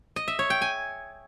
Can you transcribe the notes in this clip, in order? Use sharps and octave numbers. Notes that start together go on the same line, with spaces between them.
D#5
E5
C#5
G5
G#5